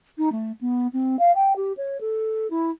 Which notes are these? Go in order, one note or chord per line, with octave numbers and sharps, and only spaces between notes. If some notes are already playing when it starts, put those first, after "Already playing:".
D#4
A3
B3
C4
F5
G5
G4
C#5
A4
E4